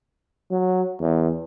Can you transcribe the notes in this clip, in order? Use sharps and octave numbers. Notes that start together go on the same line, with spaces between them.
F#3
E2